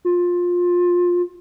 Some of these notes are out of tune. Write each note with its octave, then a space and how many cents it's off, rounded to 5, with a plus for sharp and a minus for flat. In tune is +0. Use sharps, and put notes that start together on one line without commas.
F4 +20